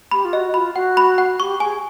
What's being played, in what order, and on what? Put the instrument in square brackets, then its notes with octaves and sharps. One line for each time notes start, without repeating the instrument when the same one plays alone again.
[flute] G4 [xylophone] B5
[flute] F4
[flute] F#4 [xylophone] D#5
[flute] F4 [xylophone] B5
[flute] F#4 [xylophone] F#5
[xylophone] B5
F#5
[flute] G4 [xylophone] C#6
[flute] G#4 [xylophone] G#5